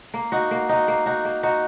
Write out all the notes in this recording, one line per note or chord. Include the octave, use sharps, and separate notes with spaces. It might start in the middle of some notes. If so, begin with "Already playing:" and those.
A#3
D#4 F#4
A#3
D#4 F#4
A#3
D#4 F#4
A#3
D#4 F#4